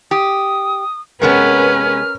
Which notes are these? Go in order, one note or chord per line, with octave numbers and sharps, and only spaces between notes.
G4 D#6
C3 G#3 B3 C#4 A#4 B4 F6